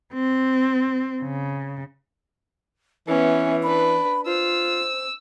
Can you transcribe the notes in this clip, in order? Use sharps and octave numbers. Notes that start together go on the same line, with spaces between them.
C4
C#3
E3 B3 C#4 E5
D4 B4 B5
F4 C5 E6